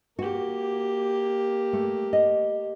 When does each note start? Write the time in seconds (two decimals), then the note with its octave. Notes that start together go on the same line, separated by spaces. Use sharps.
0.19 A#3 F#4 G4
1.73 A3
2.13 D#5